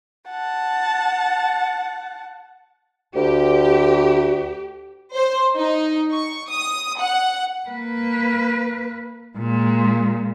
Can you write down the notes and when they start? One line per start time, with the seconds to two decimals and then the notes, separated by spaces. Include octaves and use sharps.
0.28 F#5 A5
3.16 D2 G4
5.14 C5
5.56 D#4
6.12 C#6
6.49 D#6
7.00 F#5
7.69 A#3 B4
9.37 A#2 G#3